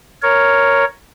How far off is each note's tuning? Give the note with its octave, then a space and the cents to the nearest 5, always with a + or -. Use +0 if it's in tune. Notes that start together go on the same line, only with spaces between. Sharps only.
A#4 +0 C#5 +0